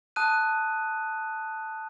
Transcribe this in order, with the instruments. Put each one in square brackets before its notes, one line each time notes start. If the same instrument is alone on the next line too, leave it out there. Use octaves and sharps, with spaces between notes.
[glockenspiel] A5 D#6 F#6 D#7